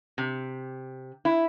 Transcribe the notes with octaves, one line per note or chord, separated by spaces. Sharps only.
C3
E4